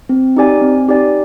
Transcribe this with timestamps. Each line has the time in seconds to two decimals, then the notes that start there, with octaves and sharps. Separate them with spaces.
0.09 C4
0.36 D#4 G4 D5 G#5
0.62 C4
0.88 D#4 G4 D5 G#5